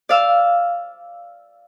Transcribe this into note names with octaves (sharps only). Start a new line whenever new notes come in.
D5 F5 E6